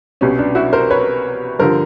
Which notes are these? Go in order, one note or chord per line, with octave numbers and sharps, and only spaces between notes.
C2 B2 G3 C#4
D4
E4 F#4
A#4 C5
B4 C#5
G2 D3 F3 A#4 C5